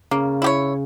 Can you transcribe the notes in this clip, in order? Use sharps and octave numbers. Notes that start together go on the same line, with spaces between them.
C#3 A#3
E4 G4 C#5